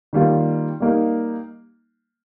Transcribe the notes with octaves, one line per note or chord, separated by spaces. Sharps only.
D#3 G3 A#3 F4
G3 A#3 D#4